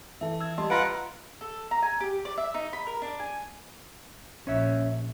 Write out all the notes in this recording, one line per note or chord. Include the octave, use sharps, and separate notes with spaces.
E3 A4 E5
E6 G#6
G3 D#5 A5 C6
F4 B4 F5 F#5 A#5 A#6 D7
A4
A#5
G#5
G4
D5
E5
D#4
B5
A#4
D4
G#5
A#1 C#4 C#5 E5